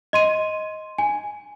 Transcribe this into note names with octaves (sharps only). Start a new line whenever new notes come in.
D#5 C6 D#7
G#5